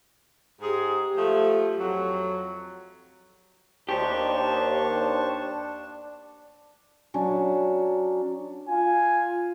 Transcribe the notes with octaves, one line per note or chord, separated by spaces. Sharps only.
G#2 G4 G#4
F3 A3
F2 F#3
D#2 D4 G4 C5 A5 C#6
F#3 C#4 D4
F4 G#5